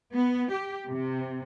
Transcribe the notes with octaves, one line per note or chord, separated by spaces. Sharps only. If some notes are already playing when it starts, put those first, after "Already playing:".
B3
G4
C3